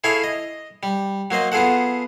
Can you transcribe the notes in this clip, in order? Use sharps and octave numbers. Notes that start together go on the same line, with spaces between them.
E4 G#4 A4 C#5 F5
D#5
G3
F#3 A#3 C5 D#5
B3 F4 G#4 A4 F#5